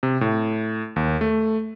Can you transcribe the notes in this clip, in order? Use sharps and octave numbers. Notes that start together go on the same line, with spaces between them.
C3
A2
D#2
A3